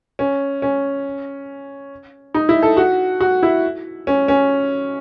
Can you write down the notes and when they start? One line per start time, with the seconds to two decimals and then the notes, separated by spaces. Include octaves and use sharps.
0.19 C#4
0.62 C#4
2.35 D#4
2.49 E4
2.62 A4
2.77 F#4
3.20 F#4
3.43 E4
4.07 C#4
4.28 C#4